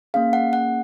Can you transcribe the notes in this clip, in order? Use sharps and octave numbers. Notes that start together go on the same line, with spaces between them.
A#3 C#4 G#4 F5
F#5
F#5